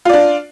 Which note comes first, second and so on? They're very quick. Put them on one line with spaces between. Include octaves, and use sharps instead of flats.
F4 D5 D4